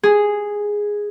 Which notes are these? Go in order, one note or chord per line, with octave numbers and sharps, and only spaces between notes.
G#4